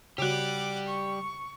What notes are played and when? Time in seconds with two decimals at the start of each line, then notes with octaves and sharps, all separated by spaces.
0.18 C#3 G3 F#4 G4 F#5 D6
0.88 C#6